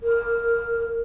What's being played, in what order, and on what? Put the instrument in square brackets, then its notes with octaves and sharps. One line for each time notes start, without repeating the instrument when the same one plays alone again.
[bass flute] A#4